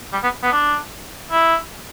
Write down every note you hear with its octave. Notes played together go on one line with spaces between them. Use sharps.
G3
B3
B3
D4
E4